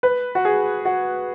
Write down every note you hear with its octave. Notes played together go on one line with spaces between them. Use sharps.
B4
F#4
G#4
F#4